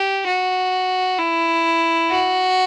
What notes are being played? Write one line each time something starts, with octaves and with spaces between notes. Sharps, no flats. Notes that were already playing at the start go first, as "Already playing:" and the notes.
Already playing: G4
F#4
E4
F#4